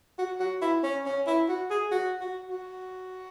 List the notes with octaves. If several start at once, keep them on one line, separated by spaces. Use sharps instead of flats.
F#4
F#4
E4
C#4
C#4
E4
F#4
G#4
F#4
F#4
F#4